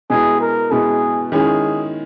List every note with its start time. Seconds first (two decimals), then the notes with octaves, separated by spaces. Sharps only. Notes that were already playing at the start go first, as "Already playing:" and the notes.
0.10 B2 G#3 B3 E4 G#4
0.41 A#4
0.71 B2 G#3 B3 E4 G#4
1.32 D#3 G#3 C#4 E4 G#4